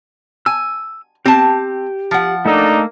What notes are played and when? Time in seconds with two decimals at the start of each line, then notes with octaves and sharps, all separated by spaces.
0.46 G#5 E6
1.26 C4 G4 A5
2.11 F3 F#5
2.46 A3 A#3 D4 D#4 A4